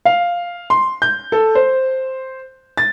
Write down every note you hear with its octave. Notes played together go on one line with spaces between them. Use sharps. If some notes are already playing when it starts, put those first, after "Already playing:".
F5
C6
G6
A4
C5
A6